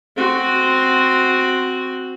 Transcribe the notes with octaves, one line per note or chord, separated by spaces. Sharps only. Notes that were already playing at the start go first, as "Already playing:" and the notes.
C4 F#4